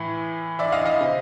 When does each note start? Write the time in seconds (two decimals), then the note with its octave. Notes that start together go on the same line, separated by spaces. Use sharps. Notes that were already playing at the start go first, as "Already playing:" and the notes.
Already playing: A2 E3
0.59 D5 E5
0.72 D#5 F5
0.86 D#5 F5
1.00 C3